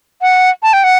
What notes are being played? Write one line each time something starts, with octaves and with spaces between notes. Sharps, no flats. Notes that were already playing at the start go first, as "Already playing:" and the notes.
F#5
A5
G5
F#5